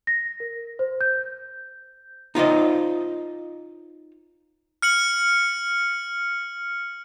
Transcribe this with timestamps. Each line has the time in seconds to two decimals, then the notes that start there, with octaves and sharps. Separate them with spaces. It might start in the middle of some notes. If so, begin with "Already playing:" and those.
0.07 A#6
0.40 A#4
0.79 C5
1.01 G6
2.35 D#4 F4 C5 D#5
4.82 F6 C#7 F#7